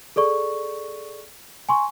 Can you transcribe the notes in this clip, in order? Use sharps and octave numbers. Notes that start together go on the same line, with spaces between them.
G#4 A4 D5 C#6
G#5 C6 C#6